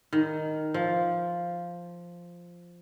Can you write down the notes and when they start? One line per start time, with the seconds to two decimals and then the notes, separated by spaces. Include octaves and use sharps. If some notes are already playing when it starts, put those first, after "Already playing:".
0.13 D#3
0.74 F3